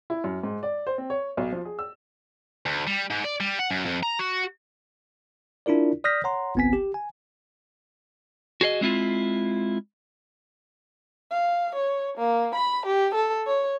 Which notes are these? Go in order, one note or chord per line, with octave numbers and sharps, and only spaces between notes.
E4
F#2
G#2
D5
C5
C4
C#5
B1
F3
G#4
E6
D2
G3
G#2
D5
G3
F#5
F#2
F2
A#5
F#4
D4 E4 F4 A#4 D5
D5 D#6 F6 G6 A#6 B6
C#5 F#5 A#5 C6
G1 C2 B3 C4 G#5 B6
G4
G#5
F#4 G#4 C5 D#5
G#3 C4 E4 F4
F5
C#5
A#3
B5
G4
A4
C#5